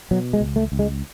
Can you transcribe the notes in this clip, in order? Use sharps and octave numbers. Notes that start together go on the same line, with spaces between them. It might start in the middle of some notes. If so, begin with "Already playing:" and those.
B2 F#3
G#3
C#2
A3
C#2
G#3